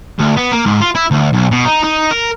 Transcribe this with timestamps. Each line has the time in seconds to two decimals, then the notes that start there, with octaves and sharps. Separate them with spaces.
0.19 D2
0.37 B3
0.52 A#3
0.66 G#2
0.81 F4
0.95 E4
1.11 D2
1.33 B1
1.51 B2
1.65 D#4
1.84 D#4
2.11 A#4